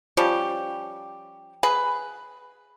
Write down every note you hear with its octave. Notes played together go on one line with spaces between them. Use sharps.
F3 G3 C#4 G4
G#4 B4